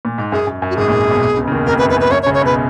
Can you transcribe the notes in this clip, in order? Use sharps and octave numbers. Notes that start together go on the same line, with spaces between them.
A#2
G#2
F#2 G#4
F#2
F#2
F#4
G#1 G#2 G#4
A#1 A#2
B1 B2
B2
C#2 C#3
C#3
D#2 D#3
F2 A#4
B4
F#2
B4
F#2
B4
F#2 C#5
C#5
C#2 C#3
C#5
B1 B2
B4